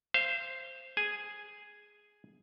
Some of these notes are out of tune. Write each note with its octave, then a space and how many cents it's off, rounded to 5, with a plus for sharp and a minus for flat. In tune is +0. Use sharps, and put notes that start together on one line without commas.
C5 +0 F5 -35
G#4 +0 G#5 +0